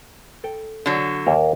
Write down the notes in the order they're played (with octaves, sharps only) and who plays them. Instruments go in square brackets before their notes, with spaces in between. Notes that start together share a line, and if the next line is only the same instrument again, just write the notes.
[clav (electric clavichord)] A4 G5
[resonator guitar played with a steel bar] D3 F#3
[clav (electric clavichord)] D#2 A#3 A#4